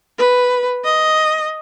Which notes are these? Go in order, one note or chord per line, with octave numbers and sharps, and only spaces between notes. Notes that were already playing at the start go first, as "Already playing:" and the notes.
B4
D#5